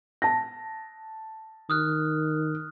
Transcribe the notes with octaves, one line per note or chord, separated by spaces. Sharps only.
A5 A#6
D#3 D#6 F6 F#6